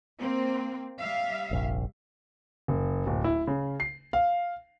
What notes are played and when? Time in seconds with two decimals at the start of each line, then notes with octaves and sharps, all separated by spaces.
0.20 A#3 C4
0.99 G3 E5 F5
1.51 F1 A#1
2.68 F#1
3.07 D1
3.24 E4
3.47 C#3
3.80 C7
4.13 F5